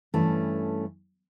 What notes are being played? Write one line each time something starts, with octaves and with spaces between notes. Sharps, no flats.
G2 E3 A3 C#4 A4